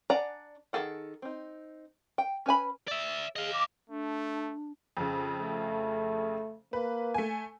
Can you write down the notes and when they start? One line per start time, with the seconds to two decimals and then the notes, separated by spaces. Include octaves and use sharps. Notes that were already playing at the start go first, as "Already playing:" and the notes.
0.10 D4 D5 F#5 G#5 A#5
0.73 D#3 F3 G#4 A4 F#5
1.22 C4 D#4
2.18 G5
2.46 C#4 B4 G#5 B5
2.88 D5 E5
3.36 G#4 D#5 F5
3.53 D6
3.90 A3 D4
4.97 F2 C#3
5.41 A3
6.73 A#3 B4
7.14 A3 G#5